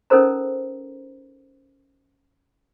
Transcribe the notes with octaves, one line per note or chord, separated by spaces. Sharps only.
C#4 D#4 A4 A#4 C5 A#5